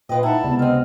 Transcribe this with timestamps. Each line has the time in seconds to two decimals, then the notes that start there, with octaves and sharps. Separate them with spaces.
0.09 A#2 F4 B4 D#5 G5
0.23 G3 D#4 E4 E5 F#5 A5
0.43 C#2 C3 B3 D5
0.59 D3 C4 D#5 F6